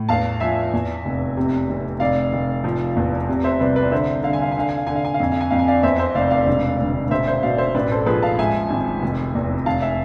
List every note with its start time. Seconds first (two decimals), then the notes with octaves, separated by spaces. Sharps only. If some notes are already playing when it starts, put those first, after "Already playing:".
Already playing: A2
0.09 E2 F5 A5
0.40 F3 E5 G#5
0.73 E2
1.05 F1
1.37 C3
1.69 F1
2.00 F1 D5 F5
2.33 F1
2.64 F3
2.96 E2
3.29 C3
3.44 C5 E5
3.60 C2 B4 D5
3.76 B4 D5
3.91 D3 C5 E5
4.23 D3 F5
4.33 G#5
4.42 F5
4.51 G#5
4.56 D3 F5
4.69 G#5
4.77 F5
4.87 D3 G#5
4.96 F5
5.05 G#5
5.14 F5
5.20 F2 G#5
5.32 F5
5.40 G#5
5.51 F2 F5
5.59 G#5
5.68 D5 F5
5.83 E2 C5 E5
5.99 C5 E5
6.15 F1 D5 F5
6.31 D5 F5
6.47 E1
6.79 D2
7.11 E1 C5 E5
7.27 C5 E5
7.43 B2 D5 F5
7.58 C5 E5
7.74 A1 B4 D5
7.91 A4 C5
8.06 F3 G#4 B4
8.22 F5 A5
8.38 G#2 E5 G#5
8.70 G#1
9.02 F1
9.35 E2
9.66 F1 F5 A5
9.82 E5 G#5